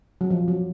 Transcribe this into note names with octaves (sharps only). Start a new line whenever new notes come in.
F#3
F3
F#3